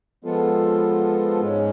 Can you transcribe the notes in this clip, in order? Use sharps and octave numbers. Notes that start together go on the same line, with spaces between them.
F3 G#3 B3 F4 A4
G#2 G#3 C#4